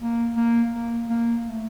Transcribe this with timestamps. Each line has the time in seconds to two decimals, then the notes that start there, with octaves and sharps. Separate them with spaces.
0.01 A#3
0.37 A#3
0.73 A#3
1.10 A#3
1.46 A3